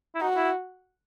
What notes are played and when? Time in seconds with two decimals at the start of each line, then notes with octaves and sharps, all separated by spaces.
0.15 E4
0.21 D#4 F#4
0.36 E4